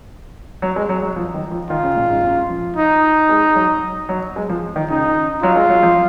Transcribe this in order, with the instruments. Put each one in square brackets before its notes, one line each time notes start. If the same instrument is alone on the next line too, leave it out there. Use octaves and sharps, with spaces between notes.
[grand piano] F#3
G#3
F#3
F#3
F3
D#3
F3
[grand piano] D#3 [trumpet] F4
[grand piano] C#3
A#2
G#2
F#2
F3
[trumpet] D#4
[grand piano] G#3
F#3
F#3
G#3
F3
D#3
[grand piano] C#3 [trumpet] D#4
[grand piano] F#3 [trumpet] F4
[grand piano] G#3
F#3
F3